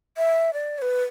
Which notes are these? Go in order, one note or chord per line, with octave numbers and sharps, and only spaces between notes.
E5
D5
C#5
B4